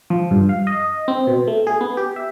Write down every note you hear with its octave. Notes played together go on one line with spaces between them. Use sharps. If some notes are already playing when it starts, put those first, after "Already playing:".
F3
G2
F5
D#5
C4
B2
A3
G#4
B3
G4
E5